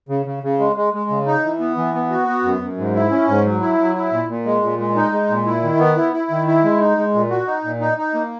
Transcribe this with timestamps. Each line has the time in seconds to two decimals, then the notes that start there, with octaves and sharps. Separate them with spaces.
0.09 C#3
0.26 C#3
0.43 C#3
0.59 G#3
0.76 G#3
0.94 G#3
1.10 C#3
1.26 D#4
1.43 E3
1.60 B3
1.77 E3
1.94 B3
2.10 F#4
2.28 B3
2.44 F#2
2.61 F#2
2.77 G#2
2.94 E4
3.11 C#4
3.28 G#2
3.45 F#3
3.61 E4
3.78 F#3
3.95 E4
4.12 A#2
4.29 A#2
4.45 G#3
4.62 A#2
4.79 G#3
4.96 D#4
5.12 G#3
5.29 A#2
5.46 E4
5.63 D#3
5.79 B3
5.96 E4
6.13 E4
6.30 D#3
6.47 E4
6.64 G#3
6.80 D#4
6.97 G#3
7.14 A#2
7.30 F#4
7.47 D#4
7.64 A#2
7.81 D#4
7.98 D#4
8.14 A#3